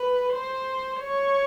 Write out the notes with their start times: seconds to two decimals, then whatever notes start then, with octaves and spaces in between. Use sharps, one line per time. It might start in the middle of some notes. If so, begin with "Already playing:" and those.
Already playing: B4
0.33 C5
1.01 C#5